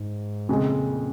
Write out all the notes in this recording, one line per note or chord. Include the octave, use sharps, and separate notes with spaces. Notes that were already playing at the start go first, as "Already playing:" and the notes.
Already playing: G#2
F2 A#2 C#3 G#3